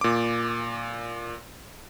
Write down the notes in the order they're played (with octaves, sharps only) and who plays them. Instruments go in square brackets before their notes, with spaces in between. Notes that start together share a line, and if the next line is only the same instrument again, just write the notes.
[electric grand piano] A#2 D6